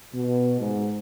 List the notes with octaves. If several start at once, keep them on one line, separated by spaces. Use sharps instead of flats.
B2
G#2